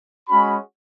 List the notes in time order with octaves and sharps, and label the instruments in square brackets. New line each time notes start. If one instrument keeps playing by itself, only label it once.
[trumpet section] G#3 C#4 F#4 B5